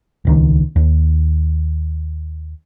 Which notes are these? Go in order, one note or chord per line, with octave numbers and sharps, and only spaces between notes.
D#1 C#2 D#3
D#2